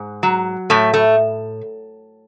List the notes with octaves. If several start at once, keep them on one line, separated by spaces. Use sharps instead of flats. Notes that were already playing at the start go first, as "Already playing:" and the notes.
Already playing: G#2
F#3
A2 A3
A3